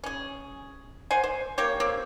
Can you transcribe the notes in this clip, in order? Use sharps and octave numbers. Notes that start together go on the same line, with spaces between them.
C#4 G#4
C5 F#5 G#5
C5
A#3 G4 C#5
A#3 C4 G4